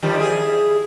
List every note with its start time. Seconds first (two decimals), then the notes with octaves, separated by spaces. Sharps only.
0.02 D#3 F3 G3
0.17 E4 G#4